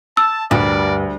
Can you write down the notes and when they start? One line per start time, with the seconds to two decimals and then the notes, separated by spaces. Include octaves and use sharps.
0.17 A5 E6
0.51 D2 G2 A#4 D5